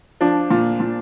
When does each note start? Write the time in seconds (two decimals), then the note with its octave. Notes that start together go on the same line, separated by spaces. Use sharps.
0.21 F3 D4
0.51 A#2
0.80 A#2